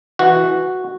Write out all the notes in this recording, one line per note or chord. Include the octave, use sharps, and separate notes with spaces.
E3 F#4